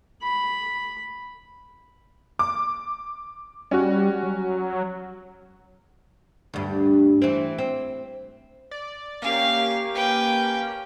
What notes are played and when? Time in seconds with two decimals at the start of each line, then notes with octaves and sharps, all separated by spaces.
0.22 B5
2.39 D6
3.71 G3 C#4 F#4
4.23 F#3
6.54 D2 G2
7.22 E3 C4
7.58 C4
8.71 D5
9.22 A#3 C#4 G4 F5
9.94 B4 G5